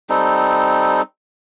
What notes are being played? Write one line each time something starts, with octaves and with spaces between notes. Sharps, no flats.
G3 C4 D#4 A4